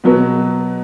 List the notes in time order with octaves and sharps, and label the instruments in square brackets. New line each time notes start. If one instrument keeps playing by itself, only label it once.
[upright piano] B2 F#3 B3